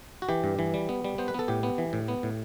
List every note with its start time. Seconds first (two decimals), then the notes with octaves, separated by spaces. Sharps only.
0.22 F#4
0.29 E3 G4
0.44 G2
0.59 E3
0.74 G3
0.89 B3
1.04 G3
1.18 B3 C5
1.28 B4
1.34 B3 A4
1.48 A2 G4
1.63 B3
1.78 E3
1.93 A2
2.08 B3
2.23 A2